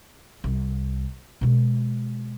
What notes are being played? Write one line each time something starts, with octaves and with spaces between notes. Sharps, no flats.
C2
B2 G#3